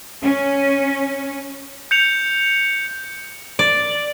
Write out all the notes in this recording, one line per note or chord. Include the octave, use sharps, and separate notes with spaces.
C#4
G6 C#7 F7
D5